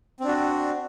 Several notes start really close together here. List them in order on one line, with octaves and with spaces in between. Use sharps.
C4 D4 F#4